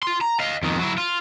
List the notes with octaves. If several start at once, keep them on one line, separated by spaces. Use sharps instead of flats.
F4 C6
A#5
D#5 F5
F2 D#3
F#3 E4
F4